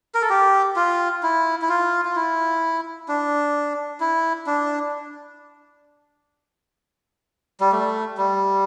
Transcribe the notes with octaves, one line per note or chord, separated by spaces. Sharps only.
A#4
A4
G4
F4
E4
E4
F4
F4
E4
D4
E4
D4
G3
A3
G3